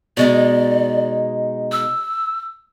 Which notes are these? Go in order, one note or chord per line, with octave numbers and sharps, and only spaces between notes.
B2 G#3 D#4 D5
E6